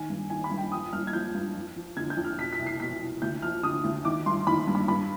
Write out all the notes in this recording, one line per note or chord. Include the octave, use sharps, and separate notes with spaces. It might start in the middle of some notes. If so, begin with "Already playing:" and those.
Already playing: D#3 G#5
G2
D#3 G#5
B5
G2
G5
F3 D#6
G2 F6
G#6
F3 G6
G2
F2
F3
D3 G#6
G6
F2
F6
B2 B6
B6
C2
C7
B2 B6
C2
D2 G6
F3 F6
D3 D#6
D2
D#3 D6
G2 C6
D#3 B5
G2
B5
G2 B5